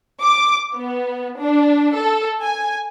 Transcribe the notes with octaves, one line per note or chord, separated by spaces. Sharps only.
D6
B3
D4
A4
G#5